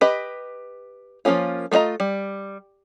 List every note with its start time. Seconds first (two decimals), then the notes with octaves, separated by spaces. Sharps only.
0.01 G4 B4 D#5
1.25 F3 A3 A#3 C#4 F4
1.72 A3 A#3 F4 D#5 A#5
2.00 G3